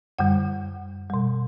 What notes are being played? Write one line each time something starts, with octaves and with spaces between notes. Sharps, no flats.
F#2 D3 G3 F#5
B2 G3